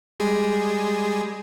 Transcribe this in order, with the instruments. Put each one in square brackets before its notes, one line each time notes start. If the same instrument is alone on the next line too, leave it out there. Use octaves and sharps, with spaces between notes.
[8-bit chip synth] G3 G#3 G#4